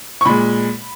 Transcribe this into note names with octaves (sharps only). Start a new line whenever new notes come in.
C#6
A#2 G#3 B5